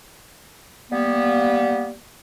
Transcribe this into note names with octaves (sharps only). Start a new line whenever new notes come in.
G3 A#3 B3